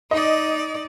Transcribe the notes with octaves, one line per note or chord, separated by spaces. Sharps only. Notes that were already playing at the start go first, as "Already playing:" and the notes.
D#4 D5 D#5